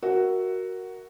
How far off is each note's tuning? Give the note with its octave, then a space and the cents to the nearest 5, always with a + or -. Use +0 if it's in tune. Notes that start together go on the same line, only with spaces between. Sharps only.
F#4 +5 A#4 +0 E5 +0